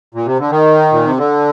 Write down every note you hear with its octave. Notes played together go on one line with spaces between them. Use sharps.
A#2
C3
D3
D#3
A#2
C3
D3